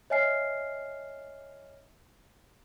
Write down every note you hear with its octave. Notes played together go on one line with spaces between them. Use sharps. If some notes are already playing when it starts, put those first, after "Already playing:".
C#5 D#5 E5 G#5 F6 C7